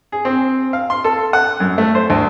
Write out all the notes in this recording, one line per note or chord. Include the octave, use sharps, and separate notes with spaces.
G#4
C4
F5
C6
A4
F#5
F#2
A3
C5
D2